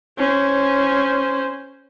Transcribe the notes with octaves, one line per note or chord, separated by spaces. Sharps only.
C#4 C5